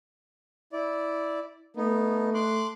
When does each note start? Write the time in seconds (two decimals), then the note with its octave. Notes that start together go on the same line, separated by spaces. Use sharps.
0.73 E4 D5
1.76 A3 B3 D#4
2.34 C6 D6 F#6